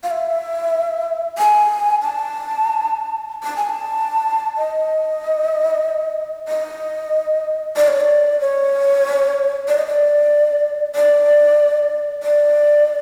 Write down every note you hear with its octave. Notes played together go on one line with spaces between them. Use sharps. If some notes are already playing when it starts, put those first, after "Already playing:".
F5
E5
G#5
A5
A5
G#5
A5
D#5
D#5
D5
C#5
D5
C#5
D5
D#5
D5
D5
D5